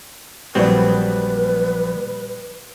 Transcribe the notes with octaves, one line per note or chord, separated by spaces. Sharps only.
A#1 F#3 G3 C4 B4 D5